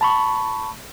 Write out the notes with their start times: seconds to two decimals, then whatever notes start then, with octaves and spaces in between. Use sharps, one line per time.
0.01 A5 B5 C#6